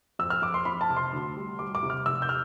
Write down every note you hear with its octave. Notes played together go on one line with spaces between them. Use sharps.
F2 E6
F6
F2 D6
C6
F2 B5
A5
C3
C6
D2
G3
G3 D6
D6
C3
F6
F1 E6
G6
F6